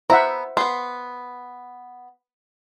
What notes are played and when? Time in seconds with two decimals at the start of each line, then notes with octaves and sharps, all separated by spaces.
0.10 B3 E4 C5 E5 F#5 A#5
0.57 B3 B4 C6